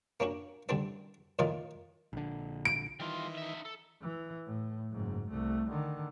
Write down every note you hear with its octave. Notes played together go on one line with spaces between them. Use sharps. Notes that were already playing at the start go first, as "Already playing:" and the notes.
A#3 C#4 D4 F#4
A1 D3 G3 C4 D4 D5
A#1 A2 D#3 D#4 F4 D5
A#1 D3
D7
D#3 E3 G3 F4
D#4 E5
A4
E3
A2
F#1 G#2
C2 A3
D3 D#3